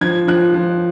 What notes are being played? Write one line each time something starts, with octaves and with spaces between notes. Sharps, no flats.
F3 G#6
F3 F#6
F3